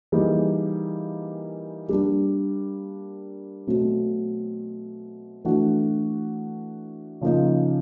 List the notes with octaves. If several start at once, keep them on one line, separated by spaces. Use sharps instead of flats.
E3 G3 A#3 D#4 G#4
G3 A#3 D4
B2 F#3 A3 C4
E3 A3 D4 F#4
C#3 F3 A#3 D#4